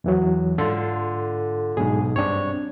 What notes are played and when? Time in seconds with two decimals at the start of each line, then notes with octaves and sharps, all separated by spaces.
0.04 E2 E3 F#3
0.58 G#2 D3 F4 A4 C6
1.77 B1 G#2 G#4
2.16 G2 C4 D4 C#5